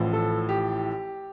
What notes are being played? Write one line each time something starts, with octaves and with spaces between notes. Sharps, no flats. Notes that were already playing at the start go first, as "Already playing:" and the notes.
Already playing: A1 A2 F3
A4
G4